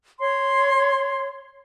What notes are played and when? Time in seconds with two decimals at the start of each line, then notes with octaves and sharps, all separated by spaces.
0.20 C#5 C6